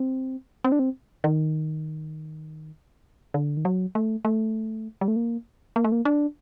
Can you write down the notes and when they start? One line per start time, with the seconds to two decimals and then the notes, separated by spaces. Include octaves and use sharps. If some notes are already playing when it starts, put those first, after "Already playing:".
Already playing: C4
0.64 C4
0.72 D4
0.79 C4
1.24 D#3
3.34 D3
3.57 D#3
3.65 F#3
3.95 A3
4.25 A3
5.01 G3
5.08 A3
5.16 A#3
5.76 A#3
5.84 A3
5.92 A#3
6.05 D4